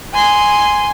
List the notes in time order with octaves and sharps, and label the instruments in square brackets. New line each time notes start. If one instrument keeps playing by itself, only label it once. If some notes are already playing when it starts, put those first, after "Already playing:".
[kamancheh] G#5 C6